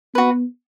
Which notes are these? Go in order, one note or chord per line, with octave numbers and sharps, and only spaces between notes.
B3 F#4 B4